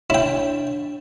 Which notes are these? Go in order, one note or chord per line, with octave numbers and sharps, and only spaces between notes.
D4 E4 C#5 G5